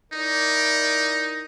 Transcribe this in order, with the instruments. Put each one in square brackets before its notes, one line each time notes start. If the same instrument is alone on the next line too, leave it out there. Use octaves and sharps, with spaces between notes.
[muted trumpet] D#4 [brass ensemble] E4 A#4 D5